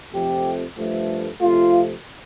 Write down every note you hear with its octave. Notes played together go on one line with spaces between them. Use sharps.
F2 C3 F3 A3 G4
G2 F3 A3
F2 C3 A3 F4